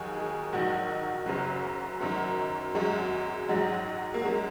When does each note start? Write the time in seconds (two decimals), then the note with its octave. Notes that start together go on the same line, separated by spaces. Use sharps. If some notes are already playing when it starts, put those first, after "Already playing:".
Already playing: D#2 D#3 F#3 G#4
0.15 G#4
0.53 A#1 G#2 D#3 F#3 F#4
1.26 F#1 F#2 C#3 F#3
2.00 F#1 F#2 D#3 F#3
2.75 G#1 F#2 F#3 G#3
3.48 A#1 G#2 F#3 G#3
4.14 A#3
4.23 F#2 F#3 G#3